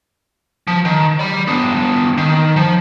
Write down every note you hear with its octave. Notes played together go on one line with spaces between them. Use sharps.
F3
D#3
D5 B5
B3 D4
D#3
F3